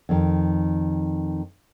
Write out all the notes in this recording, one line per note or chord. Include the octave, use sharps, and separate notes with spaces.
F2 D#3